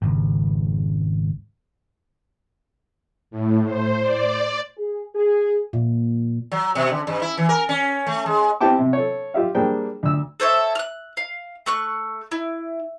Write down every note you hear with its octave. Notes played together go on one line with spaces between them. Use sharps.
G#1 C#2
A2
C5
D5
G#4
G#4
A#2
F#3
B2
D3
G2
E4
E3
A#4
C#4
A3
G#3
C4 E4 G4 G5 A5 D6
C3
A4 C#5
F4 G4 E5 F5
G3 A#3 D4 G#4 C5 G5
D2 E6
A4 C5 C#5 E5
F6 F#6
F5
A3 C#6 F#6
E4